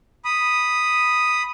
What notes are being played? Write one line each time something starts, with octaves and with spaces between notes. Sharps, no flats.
B5 D#6